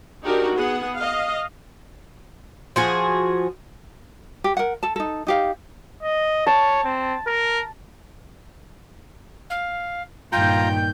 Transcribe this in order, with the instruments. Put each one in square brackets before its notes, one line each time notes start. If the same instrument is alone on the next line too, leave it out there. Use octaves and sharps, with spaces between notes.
[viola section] D4 D#4 F#4 G4 A#4
B3 G#4 F#5
D#5 F5
[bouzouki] F3 F#4 G#4
[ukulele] G4
A#4 F#5
A4 A5
D#4 A4
D#4 G4 F5
[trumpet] D#5
[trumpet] C#5 [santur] A5
[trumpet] C4
A#4
[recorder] F5
[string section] G2 A#2 D#3 [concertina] F4 A#5 [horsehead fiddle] G5 [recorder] G6